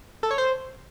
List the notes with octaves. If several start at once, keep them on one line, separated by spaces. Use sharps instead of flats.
A4
C#5
C5